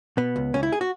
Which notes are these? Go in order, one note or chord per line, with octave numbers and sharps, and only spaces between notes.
B2 B3
C#2
C#2 C#4
E4
G#4
F#4